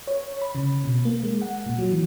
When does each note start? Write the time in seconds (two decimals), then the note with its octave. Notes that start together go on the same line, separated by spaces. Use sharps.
0.07 C#5
0.42 B5
0.55 C#3
0.84 B2
1.05 A#3
1.23 G#3
1.42 F#5
1.66 A#2
1.79 F#3
1.91 E3